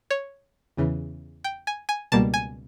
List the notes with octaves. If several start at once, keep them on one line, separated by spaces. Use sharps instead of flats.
C#5
E2 C#3 E3
G5
G#5
G#5
C#2 B2 G3 A#3 A5
G#5